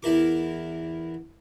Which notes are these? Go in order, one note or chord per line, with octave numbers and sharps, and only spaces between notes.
E2 E4 A#4 D6